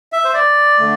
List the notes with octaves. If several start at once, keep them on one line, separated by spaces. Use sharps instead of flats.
E5
C5
D5
D3 A3